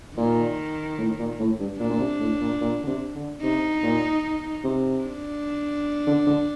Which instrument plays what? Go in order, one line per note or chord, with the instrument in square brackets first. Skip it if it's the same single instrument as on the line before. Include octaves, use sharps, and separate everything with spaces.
[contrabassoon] A#2 [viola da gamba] D#3
[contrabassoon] A2
A#2
A2
G2
[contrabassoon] A#2 [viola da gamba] D4
[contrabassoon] A#2
C3
A2
A#2
A#2
D3
C3
D3
[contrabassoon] C3 [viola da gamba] D#4
[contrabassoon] A#2
C3
[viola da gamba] D4
[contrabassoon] D3
D3